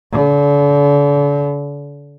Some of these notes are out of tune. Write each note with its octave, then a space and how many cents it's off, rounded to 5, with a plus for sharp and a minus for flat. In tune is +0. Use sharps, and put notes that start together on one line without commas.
D3 -40